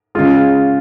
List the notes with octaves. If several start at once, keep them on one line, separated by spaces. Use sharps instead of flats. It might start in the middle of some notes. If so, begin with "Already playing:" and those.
C#3 G#3 F4